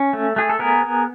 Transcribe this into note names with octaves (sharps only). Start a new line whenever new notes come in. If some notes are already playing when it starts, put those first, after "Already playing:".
Already playing: C#4
A3
A3 G#4
A4
B3 G#4 A#4
B3